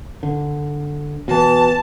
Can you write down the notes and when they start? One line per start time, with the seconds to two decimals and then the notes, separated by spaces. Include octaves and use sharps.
0.23 D3
1.28 B2 E3 A5